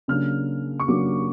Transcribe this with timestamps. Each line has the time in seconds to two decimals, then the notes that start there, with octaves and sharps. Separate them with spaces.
0.08 C#3 F#3 A#3 D4 F6
0.80 C#6
0.88 C#3 F#3 A#3 D4 D6